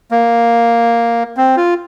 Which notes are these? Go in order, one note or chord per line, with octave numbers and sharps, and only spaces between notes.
A#3
C4
F4